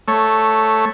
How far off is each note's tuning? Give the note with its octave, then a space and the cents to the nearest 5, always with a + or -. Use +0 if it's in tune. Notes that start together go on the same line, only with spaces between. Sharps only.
A3 +0 C#5 -5